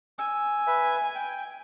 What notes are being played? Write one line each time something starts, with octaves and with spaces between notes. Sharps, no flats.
G#5 E6
B4 E5
G5